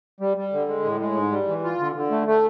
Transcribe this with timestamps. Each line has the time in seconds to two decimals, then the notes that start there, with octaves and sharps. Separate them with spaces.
0.20 G3
0.37 G3
0.53 D3
0.68 G#3
0.84 A2
1.01 G#3
1.17 G#2
1.32 G3
1.48 E3
1.64 F4
1.80 D3
1.95 D3
2.11 A3
2.27 A3